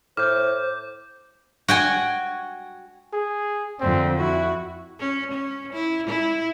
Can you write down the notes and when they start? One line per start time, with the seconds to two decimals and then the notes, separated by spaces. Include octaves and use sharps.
0.17 A2 C5 D6 F6 G6
1.68 F#4 G5 G#5
3.13 G#4
3.81 F2 D3 C4
4.21 E4 F#4
4.99 C#4
5.32 C#4
5.73 E4
6.07 E4